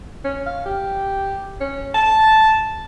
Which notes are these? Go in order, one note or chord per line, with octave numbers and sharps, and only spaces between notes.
C#4
F5
G4
C#4
A5